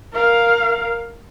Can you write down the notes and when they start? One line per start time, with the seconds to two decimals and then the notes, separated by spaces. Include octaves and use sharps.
0.13 A#4 F5